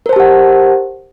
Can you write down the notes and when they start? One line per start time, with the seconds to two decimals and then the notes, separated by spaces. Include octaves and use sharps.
0.06 A#4
0.09 C5
0.13 A5
0.16 G4
0.20 F#5